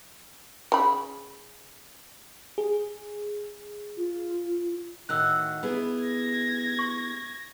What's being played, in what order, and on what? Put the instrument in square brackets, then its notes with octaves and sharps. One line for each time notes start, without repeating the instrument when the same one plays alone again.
[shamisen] C#3 B5
[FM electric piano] G#4
[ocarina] F4
[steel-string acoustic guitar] A2 D#3 F#4 [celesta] E6 F#6
[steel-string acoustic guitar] B3 E4 G#4
[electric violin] G#6 A#6
[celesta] C#6